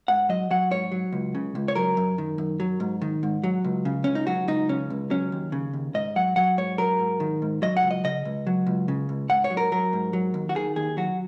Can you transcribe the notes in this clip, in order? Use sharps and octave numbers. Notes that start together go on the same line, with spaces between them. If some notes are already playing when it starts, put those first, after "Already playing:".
G#2 F#5
F#3 D#5
F#3 F#5
G#2 C#5
F#3
C#2
C#3
C#2
C#5
F#3 A#4
F#2
D#3
F#2
F#3
G#2
D#3
G#2
F#3
C#2
C#3
C#2 C#4
D#4
F#3 F#4
C#2 D#4
C#3 C#4
C#2
F#3 C#4
D#2
C#3
D#2
G#2 D#5
F#3 F#5
F#3 F#5
G#2 C#5
F#3 A#4
G#2
D#3
G#2
F#3 D#5
F#5
C#2
D#5
C#3 D#5
C#2
F#3
C#2
C#3
C#2
G#2 F#5
C#5
F#3
A#4
F#3 A#4
G#2
F#3
D#2
F#4
D#3 G#4
D#2 G#4
F#3 F#4